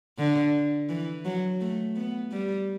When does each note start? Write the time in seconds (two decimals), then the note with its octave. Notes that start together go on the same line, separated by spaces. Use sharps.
0.18 D3
0.89 E3
1.25 F#3
1.61 A3
1.96 B3
2.32 G3